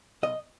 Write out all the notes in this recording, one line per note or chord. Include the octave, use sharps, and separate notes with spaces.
B1 D#5